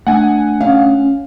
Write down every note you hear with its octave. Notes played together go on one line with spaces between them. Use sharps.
A3 D4 F#5 G#5
C#4 F5